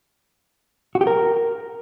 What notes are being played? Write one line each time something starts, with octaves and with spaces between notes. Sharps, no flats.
F#4
G4
A#4